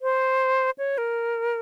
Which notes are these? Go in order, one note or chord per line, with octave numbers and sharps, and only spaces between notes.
C5
C#5
A#4